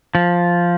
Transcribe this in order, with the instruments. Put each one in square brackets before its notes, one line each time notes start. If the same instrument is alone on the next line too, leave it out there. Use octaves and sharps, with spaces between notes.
[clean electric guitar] F3